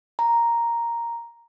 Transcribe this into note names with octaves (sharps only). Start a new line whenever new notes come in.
A#5